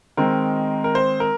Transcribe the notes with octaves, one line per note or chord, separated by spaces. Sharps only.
D#3 G#3 C4 A#4
A#4
C5
A#4